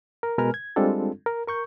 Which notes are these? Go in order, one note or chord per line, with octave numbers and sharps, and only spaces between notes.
A#4
B2 G#3 A#4 B4 G#5 F6
G#6
G3 G#3 C4 D4 F4 A4
A#4
A#4 C#6 G6